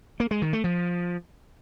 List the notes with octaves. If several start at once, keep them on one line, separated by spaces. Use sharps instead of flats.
A#3
G#3
D#3
A3
F3